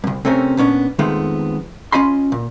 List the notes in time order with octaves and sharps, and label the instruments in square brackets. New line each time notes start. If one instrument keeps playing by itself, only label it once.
[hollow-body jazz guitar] C2 F#2
C3 A3 C4 C#4 A#4
A#2 B3 C#4 D4
F2 D#3 F3 G#3 A3 B3
C#4 F4 D#5 B5 C6
A#2